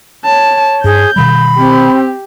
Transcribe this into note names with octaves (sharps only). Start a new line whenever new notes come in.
C#5 A5
G2 G#4 G6
B2 D#3 G3 B5
C4 G4